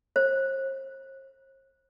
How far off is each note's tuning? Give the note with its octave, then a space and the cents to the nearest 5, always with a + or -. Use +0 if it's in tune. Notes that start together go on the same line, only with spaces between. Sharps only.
C5 +40